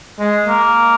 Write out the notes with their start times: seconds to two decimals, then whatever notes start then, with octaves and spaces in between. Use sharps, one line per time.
0.19 G#3
0.47 A#3